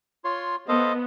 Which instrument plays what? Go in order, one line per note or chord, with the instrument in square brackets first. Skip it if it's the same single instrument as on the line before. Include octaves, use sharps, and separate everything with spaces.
[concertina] F4 C#5 C6
[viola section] B3 [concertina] A4 C5 F5 [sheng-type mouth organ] D#5